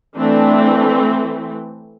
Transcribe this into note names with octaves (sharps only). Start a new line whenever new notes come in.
E3 A3 C4 D4